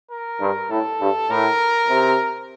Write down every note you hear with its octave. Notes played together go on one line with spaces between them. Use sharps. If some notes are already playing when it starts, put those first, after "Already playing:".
A#4
G2
A2 A4
G2
A2 A#4
C3